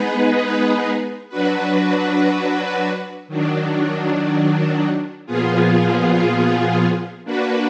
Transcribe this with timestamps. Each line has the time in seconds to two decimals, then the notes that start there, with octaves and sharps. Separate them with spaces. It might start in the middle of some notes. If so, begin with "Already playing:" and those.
Already playing: G#3 B3 D#4 G#4 B4
1.29 F#3 D4 F#4 B4
3.28 D#3 F#3 D4
5.26 A#2 F3 B3 F4 G#4
7.25 A#3 D4 F#4 B4